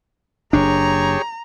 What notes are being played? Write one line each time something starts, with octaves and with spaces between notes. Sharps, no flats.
F#1 D4 G4 G#4 C#5 A#5